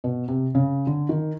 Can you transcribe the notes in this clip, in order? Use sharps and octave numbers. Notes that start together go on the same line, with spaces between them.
B2
C3
C#3
D3
D#3